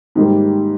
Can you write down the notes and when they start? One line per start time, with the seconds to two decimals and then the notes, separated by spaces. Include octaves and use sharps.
0.15 G#2 D#3 G3 A#3